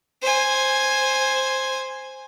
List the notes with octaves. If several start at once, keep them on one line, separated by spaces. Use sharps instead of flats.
C5 G#5